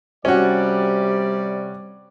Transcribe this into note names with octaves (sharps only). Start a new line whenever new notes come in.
C3 G3 C#4 F#4 D5